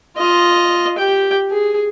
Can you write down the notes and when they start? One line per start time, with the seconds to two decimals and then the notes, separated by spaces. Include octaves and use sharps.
0.17 F4 D#5
0.98 G4 G5
1.51 G#4